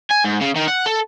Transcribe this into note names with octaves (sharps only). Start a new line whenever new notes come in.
G#5
G#2
C#3
D#3
F#5
A4